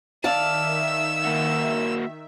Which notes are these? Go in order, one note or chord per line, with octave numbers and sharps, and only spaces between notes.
D#3 D5 E5 F5 A5 E6
A#3 F#4